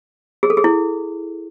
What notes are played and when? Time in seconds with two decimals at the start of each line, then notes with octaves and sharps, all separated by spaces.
0.43 G#4
0.50 A4
0.57 G#4
0.64 E4